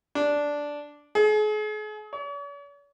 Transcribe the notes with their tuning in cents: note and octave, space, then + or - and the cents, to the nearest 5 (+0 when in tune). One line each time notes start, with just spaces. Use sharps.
D4 -5
G#4 +40
C#5 +45